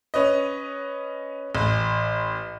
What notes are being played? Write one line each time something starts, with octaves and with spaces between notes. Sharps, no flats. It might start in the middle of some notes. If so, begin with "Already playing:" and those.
C#4 B4 D#5
A1